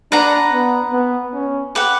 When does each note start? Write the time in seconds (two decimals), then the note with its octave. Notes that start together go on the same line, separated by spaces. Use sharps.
0.12 D4 B4 F#5 A#5
0.53 B3
0.93 B3
1.34 C#4
1.75 G4 B4 F#5